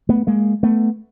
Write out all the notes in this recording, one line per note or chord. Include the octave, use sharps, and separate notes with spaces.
A3 B3
G#3 A#3
A3 B3